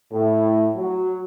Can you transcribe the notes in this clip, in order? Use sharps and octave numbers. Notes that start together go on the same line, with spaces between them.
A2
F#3